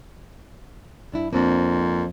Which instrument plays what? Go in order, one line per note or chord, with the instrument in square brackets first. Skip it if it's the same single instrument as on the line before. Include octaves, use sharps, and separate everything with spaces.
[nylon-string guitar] G2 D4 E4
[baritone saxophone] F2 [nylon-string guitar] A#3 C4 D4